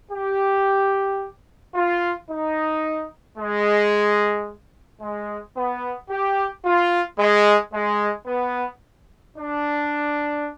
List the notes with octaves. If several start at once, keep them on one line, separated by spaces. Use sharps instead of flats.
G4
F4
D#4
G#3
G#3
B3
G4
F4
G#3
G#3
B3
D4